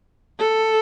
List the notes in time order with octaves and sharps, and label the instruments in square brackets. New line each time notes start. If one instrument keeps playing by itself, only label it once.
[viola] A4